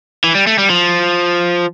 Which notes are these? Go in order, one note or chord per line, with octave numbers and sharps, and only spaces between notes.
E3
G3
A3
G3
F3